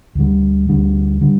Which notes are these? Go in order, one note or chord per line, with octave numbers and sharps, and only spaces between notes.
D2 D3 G3
D2 D3 G3
D3 G3